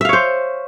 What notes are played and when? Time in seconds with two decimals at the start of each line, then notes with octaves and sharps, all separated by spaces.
0.01 E5
0.05 F5
0.09 C#5
0.13 C5